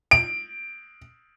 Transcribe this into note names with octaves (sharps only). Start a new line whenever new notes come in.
D7